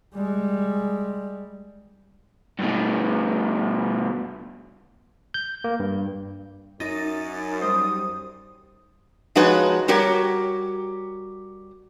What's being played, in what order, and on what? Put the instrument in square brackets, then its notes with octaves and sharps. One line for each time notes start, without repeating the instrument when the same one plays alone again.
[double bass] G3 G#3
[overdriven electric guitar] G2 B2
[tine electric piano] G6
A#3
G2
[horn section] F#2 [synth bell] D#4 A6
[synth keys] G3 C5 [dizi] D#6
[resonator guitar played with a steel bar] F3 G#3 D#4 F#4 B4 C#5
G3 F#4 G4 A#4 C#5